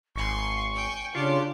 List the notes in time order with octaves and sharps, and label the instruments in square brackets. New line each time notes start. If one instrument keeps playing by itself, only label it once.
[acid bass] G#1 [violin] G#5 C6 [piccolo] C#6
[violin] G5 G#5
[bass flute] C#3 [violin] D4 G4 [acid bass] F4